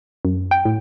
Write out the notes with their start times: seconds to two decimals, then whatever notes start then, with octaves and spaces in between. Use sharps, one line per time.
0.25 F#2
0.51 G5
0.65 A2